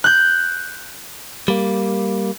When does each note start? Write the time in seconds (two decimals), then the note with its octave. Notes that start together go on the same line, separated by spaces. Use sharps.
0.04 F#6 G6
1.48 G3 A#3